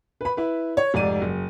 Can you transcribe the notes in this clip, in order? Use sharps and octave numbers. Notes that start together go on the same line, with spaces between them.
B4 B5
E4 B4
C#5
F1 G#2 D5 D#7
F#1